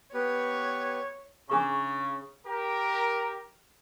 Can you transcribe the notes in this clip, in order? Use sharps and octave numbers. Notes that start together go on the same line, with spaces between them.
B3 G4 B4 C#5
C#3 D4 G#4 C#6
G4 A#4